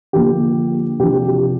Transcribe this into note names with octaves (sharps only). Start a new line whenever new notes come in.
D3 F3 A#3 G4
C3 F3 D4 G4
G4
G4